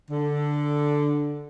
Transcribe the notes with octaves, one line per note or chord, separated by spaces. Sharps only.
D3